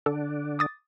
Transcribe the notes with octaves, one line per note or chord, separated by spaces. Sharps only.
D3 D4 A4
D6 D#6 A6